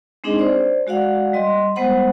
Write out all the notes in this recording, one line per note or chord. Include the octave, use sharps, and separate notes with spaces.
G#3 C4 D4 D#4 G#4 D#5
C5 D5
G#3 F#4 D5 F5 F#5
G3 D#5 C6
G3 G#3 B3 C5 F#5 B5